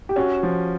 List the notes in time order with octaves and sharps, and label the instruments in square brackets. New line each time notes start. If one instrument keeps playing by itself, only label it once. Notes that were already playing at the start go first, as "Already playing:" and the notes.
[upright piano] G4
[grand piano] C#4 [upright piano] F#4
[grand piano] F3